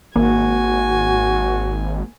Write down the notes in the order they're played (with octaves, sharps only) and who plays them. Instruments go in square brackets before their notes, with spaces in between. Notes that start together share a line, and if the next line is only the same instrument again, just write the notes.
[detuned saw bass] G#1 [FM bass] A#3 [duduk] F#4 [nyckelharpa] G#5